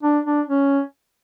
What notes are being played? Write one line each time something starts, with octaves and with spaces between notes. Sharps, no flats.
D4
D4
C#4